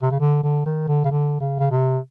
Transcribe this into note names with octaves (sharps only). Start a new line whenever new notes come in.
C3
C#3
D3
D3
D#3
D3
C#3
D3
C#3
C#3
C3